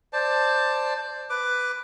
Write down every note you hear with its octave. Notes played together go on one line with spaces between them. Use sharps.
C5 D5 A5
B4 D6